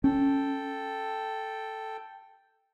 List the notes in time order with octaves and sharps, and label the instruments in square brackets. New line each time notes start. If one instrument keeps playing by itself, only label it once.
[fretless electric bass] C#4 [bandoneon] A4 G5